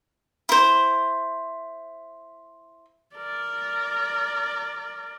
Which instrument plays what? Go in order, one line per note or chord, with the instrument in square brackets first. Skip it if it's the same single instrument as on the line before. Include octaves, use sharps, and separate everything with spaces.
[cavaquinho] E4 C5
[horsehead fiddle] A#4 D5